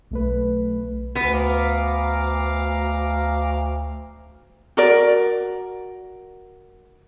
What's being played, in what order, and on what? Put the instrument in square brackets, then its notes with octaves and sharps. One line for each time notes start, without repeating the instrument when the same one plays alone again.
[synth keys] B1 A3 B4
[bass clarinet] D2 [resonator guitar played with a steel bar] B3 B4
[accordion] F5 A#5 D6
[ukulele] F#4 A#4 D5